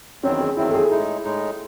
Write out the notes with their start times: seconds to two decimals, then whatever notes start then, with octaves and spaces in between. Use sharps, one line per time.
0.23 E2 D#3 F#3 C4 C#4
0.40 G#4
0.57 E2 D#3 F#3 C4 E4
0.69 A4
0.74 G#4
0.90 A2 G#3 D#4 E4
1.24 A2 G#3 D#4